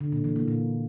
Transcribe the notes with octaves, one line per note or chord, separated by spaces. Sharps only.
D3
A#2
E3
A#3
A#2